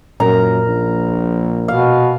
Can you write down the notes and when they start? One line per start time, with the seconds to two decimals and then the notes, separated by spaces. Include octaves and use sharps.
0.20 F#2 A#2 A#4 A#5
0.67 A#1
1.68 B2 F5